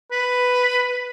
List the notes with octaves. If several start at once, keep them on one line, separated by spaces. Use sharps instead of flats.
B4